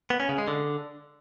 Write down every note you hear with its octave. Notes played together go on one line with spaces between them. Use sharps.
B3
C#4
C#3
G#3
D3